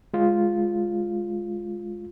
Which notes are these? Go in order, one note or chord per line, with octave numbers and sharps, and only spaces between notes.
G#3 F4